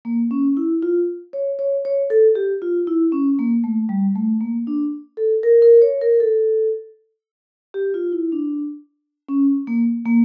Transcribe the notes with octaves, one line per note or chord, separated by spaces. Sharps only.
A#3
C#4
E4
F4
C#5
C#5
C#5
A4
G4
F4
E4
C#4
A#3
A3
G3
A3
A#3
D4
A4
A#4
A#4
C#5
A#4
A4
G4
F4
E4
D4
C#4
A#3
A#3